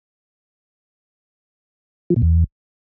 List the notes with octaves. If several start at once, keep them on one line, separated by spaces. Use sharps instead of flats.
F3
A#2
E2